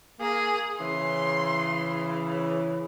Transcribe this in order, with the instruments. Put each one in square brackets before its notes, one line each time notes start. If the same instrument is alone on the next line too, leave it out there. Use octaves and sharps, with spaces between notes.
[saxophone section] A#3 [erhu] G#4
[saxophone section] C#3 E3 [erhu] C6